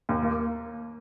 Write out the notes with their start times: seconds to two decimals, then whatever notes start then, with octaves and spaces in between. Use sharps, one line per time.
0.09 D#2
0.23 A#3